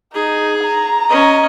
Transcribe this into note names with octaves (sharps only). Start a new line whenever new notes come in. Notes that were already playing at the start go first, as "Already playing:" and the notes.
D#4 G#4
A#5
C#4 D#5